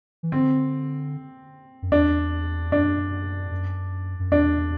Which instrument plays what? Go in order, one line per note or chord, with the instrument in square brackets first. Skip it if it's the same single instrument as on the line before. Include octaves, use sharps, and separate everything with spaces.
[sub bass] E3
[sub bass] D3 [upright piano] C4
[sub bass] F#2
[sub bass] E2 [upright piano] D4
[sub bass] F#2 [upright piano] D4
[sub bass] F#2
F#2
[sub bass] E2 [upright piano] D4